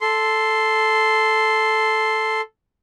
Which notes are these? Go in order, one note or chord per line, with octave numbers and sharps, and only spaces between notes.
A4 C6